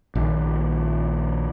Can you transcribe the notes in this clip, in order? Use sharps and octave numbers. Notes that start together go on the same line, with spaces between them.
A#1 D#3